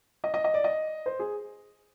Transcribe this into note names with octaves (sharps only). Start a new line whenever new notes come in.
D#5
D#5
D#5
D5
D#5
C5
G#4